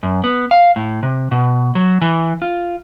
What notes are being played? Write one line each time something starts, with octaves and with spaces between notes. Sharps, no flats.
F#2
B3
F5
A2
C3
B2
F#3
E3
F4